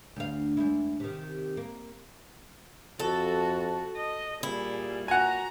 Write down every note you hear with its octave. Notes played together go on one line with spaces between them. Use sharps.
D2 F5
E2 G#3 E4
C3 D#3
A#3
F2 F#4 A4
D#5
A#2 G3 E4 G#4
A#2 F#4 F#5 G#5 A#5